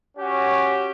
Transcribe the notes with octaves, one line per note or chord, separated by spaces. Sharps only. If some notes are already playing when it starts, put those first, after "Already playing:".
C#4 F#4 G4